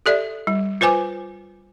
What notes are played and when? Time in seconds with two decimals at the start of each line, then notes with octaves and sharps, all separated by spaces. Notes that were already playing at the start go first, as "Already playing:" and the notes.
0.06 G4 A4 D5 E5
0.47 G3
0.81 F4 B4 C5 G#5 D6